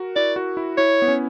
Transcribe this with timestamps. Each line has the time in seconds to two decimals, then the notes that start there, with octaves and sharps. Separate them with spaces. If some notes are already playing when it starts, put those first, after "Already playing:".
Already playing: F#4 A#4
0.16 E4 D5
0.36 F#4
0.57 E4
0.77 E4 C#5
1.02 B3
1.08 C#4